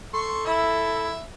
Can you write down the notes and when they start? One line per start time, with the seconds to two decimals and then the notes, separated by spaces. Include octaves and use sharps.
0.14 A4 C6 C#6
0.46 E4 E5